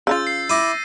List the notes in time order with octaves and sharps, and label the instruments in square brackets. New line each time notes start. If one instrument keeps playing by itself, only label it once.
[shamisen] C#3 D#4 F4 [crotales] E6 G6 A6
[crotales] C7
[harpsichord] E4 D6 [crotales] A#6 D#7